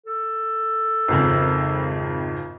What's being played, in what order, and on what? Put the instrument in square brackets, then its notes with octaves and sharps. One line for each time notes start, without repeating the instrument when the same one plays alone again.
[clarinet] A4
[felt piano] G#1 F2 C#3